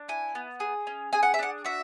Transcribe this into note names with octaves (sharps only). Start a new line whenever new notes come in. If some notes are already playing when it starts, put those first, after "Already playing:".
Already playing: D4
E4 G#5
B3
G#4
C#4
G#4 G#5
F#5
E5
D4 F#5
F#4 E5